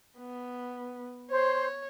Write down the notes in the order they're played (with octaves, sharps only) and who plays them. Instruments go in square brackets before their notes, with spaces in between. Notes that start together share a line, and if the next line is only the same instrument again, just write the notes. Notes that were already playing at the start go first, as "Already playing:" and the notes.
[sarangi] B3
[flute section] C5 [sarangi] C#5